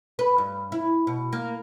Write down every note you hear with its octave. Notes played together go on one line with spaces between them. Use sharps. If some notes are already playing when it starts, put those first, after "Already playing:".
B4
G2
E4
B2
A#3